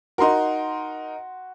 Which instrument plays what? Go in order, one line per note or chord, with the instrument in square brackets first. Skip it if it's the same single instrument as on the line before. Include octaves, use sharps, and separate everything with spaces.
[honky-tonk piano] D#4 A#4 [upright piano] F#4 C6